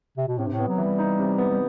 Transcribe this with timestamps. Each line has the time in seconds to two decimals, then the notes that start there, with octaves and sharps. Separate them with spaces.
0.17 C3
0.28 B2
0.38 A2 C3
0.47 G2
0.53 A2
0.59 B3
0.69 F#3
0.78 E3
0.83 G3
0.99 D#4
1.19 C3
1.38 B3
1.50 G3